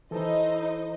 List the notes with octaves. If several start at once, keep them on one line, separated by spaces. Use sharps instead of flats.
E3 D#4 E4 A4 C5 D#5